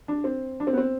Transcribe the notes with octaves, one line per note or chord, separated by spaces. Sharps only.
D4
C4
D4
C4
B3
C4